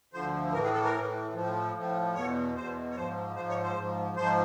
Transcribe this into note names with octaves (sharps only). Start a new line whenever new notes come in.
D2 D3 F3 C5
A2 E3 A#4
G#4
A4
A#4
A2 E3
A2 F3
A2 F3
E2 B2 C#5
E2 B2 C5
C#5
G#2 F3 C5
G#2 F3 C5
C#5
C5
G#2 F3
G#2 F3 C5